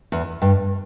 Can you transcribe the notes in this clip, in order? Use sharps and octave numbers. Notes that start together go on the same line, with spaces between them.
E2
G2